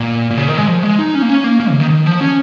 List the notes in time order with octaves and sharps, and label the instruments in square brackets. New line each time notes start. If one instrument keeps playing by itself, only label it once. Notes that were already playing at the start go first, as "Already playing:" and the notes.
Already playing: [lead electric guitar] A#2
A#2
C#3
D#3
G#3
F3
G#3
D#4
C#4
A#3
C#4
A#3
A#3
C#3
D#3
D#3
F3
C#4